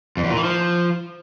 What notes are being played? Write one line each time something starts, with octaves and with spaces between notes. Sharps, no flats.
F2
E2
A#2
E3
F3